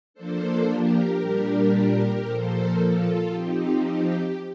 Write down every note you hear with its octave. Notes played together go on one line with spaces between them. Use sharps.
F3 A#3 D4 A4 C5
G4 A#4
A#2 G3 D4
A#2 F3 A#3 A4 C5
F4 A4
F3 C4 D#4 G4
G4